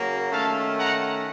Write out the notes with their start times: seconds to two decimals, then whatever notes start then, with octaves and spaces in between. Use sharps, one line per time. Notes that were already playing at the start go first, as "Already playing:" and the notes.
Already playing: C#3 F#3 A#3
0.31 D#3 A3 C#4 F5 A5
0.78 F#5 A#5